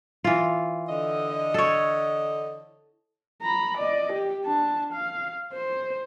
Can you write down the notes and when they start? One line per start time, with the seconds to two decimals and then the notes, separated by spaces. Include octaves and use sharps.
0.24 E3 F4
0.89 D3 D#5
1.54 A4 C#5
3.42 A#5 B5
3.78 D5 D#5
4.13 G4
4.45 D4 A5
4.93 F5
5.53 C5